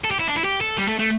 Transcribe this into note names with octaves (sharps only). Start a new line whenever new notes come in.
A4
G4
E4
D4
E4
G4
A4
G3
A3
A3